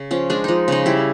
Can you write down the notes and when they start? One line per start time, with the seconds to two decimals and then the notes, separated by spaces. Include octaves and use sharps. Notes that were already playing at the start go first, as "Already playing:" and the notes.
Already playing: C#3
0.11 F3 C#4
0.30 G#3 D4
0.44 F3 D#4
0.68 C#3 D#4
0.86 G3 E4